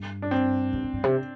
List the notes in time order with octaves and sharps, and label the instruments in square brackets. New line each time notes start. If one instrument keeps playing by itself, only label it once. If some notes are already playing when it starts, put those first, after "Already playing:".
Already playing: [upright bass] G2
[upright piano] D4
C4
[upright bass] G2
G2
G2
C3